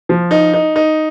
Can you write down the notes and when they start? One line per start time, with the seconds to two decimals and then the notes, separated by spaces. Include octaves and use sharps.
0.09 F3
0.31 D#4
0.53 D#4
0.76 D#4